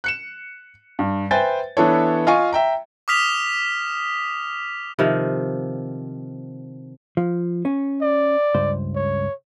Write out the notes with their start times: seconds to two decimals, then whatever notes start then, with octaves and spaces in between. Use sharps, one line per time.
0.04 F#6 C#7 E7
0.99 G2
1.31 B4 C5 E5 G5 G#5 A6
1.77 E3 B3 D4 E4 A4 C#5
2.27 F4 D#5 F5 G#5 C#6
2.53 E5 G5 A#5
3.08 D6 D#6 F6 B6 F7
4.99 C3 D#3 F3
7.17 F3
7.65 C#4
8.02 D5
8.55 C#2 G2 C5
8.95 C#5